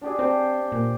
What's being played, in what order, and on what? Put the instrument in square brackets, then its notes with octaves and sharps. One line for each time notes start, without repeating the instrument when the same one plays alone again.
[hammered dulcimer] D4 G4 G#4
[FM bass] C4 [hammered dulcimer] C5 G5
[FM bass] A#2